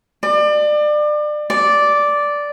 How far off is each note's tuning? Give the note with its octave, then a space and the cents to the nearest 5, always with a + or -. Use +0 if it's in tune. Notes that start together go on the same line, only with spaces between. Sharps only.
D5 +30
D5 -5